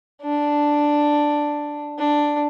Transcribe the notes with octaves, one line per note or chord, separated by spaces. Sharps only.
D4
D4